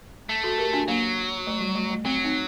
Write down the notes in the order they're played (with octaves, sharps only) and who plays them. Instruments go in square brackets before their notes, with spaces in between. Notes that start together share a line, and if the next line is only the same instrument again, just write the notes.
[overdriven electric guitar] A3
[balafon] F#4 A4
G4 A#4
D4 F#4
[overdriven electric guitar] F#3 [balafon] A#3 D4
[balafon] A3
G3
A3
A3
[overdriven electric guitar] F#3 [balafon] C4
[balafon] C4 D#4